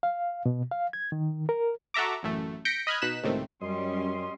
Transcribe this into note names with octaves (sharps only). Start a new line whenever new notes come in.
F5
B2
F5
G#6
D#3
A#4
F#4 A4 E5 A#5 D6
A1 F#2 A3
G6 A#6 B6 C#7 D7
D#5 B5 F6 F#6 G#6
B2 D#4 F#6 B6 E7
C#2 A2 C3 D#3 A3 C4
F#2 G3 C#4 D#5 C6